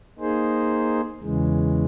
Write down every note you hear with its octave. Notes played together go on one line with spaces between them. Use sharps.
A#3 D#4 G#4 C5
E2 C#3 E3 G#3